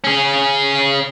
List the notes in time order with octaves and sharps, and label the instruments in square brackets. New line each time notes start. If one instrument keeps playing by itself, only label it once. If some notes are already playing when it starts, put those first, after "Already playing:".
[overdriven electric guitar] C#4 G#4